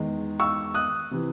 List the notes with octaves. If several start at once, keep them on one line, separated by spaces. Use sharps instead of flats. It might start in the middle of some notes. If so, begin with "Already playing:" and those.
Already playing: E2 D#3 G#3
C#6 E6
D#6 F#6
C3 E3